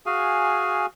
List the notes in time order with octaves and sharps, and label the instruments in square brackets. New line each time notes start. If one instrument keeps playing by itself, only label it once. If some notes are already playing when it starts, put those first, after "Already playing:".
[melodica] F#4 G#4 F5 G#5